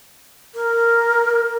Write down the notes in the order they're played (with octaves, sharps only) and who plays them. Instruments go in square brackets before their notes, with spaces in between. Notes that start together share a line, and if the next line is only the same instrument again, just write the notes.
[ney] A#4